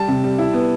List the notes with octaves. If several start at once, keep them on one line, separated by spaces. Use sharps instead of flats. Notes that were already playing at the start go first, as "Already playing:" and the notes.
Already playing: G3 A5
C3
G3
E4
B3